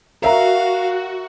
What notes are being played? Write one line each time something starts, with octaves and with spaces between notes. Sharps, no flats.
F#4 A#4 E5 F5 A#5